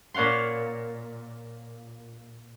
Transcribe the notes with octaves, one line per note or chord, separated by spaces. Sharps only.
A#2 C#5 F5 F#5 C6